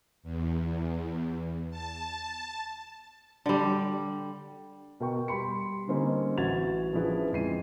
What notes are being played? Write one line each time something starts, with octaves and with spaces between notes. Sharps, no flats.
E2
A5
D3 G3
B2 A#4 G5 C#6
G3 B5 C6 C#7
D3 G3 A#3 C4 C#4 D#4
A1 F#4 G#6 A6 F7
F3 C#4 D4 E4 G#4 B4
F2 G#3 C7 D#7